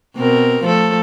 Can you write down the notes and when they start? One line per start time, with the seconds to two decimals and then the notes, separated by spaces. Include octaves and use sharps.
0.17 B2 C4 A#4
0.63 F3 A3 A4